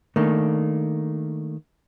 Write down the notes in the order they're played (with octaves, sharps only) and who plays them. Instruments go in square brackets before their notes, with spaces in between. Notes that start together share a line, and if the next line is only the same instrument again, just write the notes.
[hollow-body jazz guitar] D#3 A3 A#3 D4